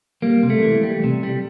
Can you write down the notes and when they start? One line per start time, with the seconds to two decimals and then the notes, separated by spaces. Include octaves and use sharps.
0.22 G3 A#3
0.43 C3
0.50 A3
0.63 E3
0.83 G3
1.04 C3
1.23 G3